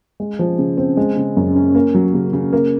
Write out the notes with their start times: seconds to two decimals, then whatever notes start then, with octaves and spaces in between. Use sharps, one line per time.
0.20 G#3
0.39 F3
0.59 C#3
0.77 C4
0.97 G#3
1.17 C#3
1.37 F#2
1.56 C#4
1.75 A#3
1.94 F#3
2.14 C#3
2.33 C#3
2.53 A#3